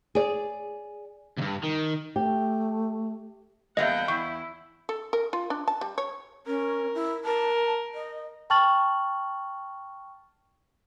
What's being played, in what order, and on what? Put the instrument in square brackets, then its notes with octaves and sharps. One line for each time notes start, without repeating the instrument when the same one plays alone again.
[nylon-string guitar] G#4 D5
[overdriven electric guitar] D2 G2
D#3
[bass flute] A3 [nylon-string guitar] G4
[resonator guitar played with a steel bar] E2 G3 A#3 [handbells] D#5 E5 [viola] F#5 G5
[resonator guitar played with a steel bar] E2 [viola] E4 [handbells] C#6
[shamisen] A4
A#4
F4
D4
A5
G3
C#5
[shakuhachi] C#4 [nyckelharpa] A#4
[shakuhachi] E4
[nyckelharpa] A#4 [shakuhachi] A5
[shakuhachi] D#5
[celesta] G5 A5 C#6 F6 A6 F#7